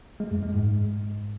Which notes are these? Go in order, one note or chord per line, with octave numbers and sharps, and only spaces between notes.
G#3
F#2
G#3
G#2